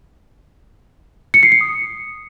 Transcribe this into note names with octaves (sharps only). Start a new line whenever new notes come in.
C#7
C7
C#7
D#6